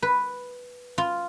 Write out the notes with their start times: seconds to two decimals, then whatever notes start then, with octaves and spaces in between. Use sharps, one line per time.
0.02 B4
0.98 F4